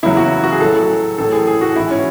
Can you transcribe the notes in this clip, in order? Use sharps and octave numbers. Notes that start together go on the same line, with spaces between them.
E2 C#3 F#3 E4
F#4
F#4
G#4
A2 F#3 A4
A2 E3 A4
G#4
G#4
F#4
G#2 E3 E4
C#4